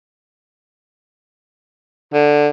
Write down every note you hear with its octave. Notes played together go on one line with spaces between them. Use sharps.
D3